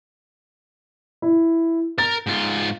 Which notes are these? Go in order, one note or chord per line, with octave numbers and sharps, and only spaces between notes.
E4
A#4 A#5 A6
G#2 F4